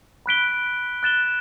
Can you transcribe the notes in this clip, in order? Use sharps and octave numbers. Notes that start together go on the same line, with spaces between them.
B5 F#6 B6 D7 G7
F#6 A6 E7 G7